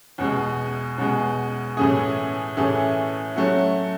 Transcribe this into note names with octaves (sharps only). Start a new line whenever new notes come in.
E2 B2 G#3
E2 B2 G#3
A2 E3 A3 C#4 G#4
A2 E3 A3 C#4 G#4
F#3 A3 C#4 F#4